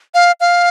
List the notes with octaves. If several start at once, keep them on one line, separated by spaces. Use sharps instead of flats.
F5
F5